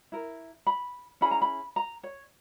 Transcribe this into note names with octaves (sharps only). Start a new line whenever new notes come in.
E4 A#4
B5
C#4 E4 G#4 B5
A#5
B5
A#5
C#5